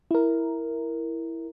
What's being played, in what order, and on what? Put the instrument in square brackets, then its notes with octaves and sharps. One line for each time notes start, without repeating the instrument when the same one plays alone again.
[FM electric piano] E4 A#4